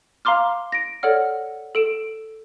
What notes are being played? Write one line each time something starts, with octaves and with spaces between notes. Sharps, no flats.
F5 A#5 C6 D6 F6
A#6 D7
A4 C#5 D5 F#5 F6
A4 D7 E7